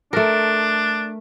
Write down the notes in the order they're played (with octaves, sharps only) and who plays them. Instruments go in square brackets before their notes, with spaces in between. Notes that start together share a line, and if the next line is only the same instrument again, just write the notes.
[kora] A3 A#4 [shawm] D4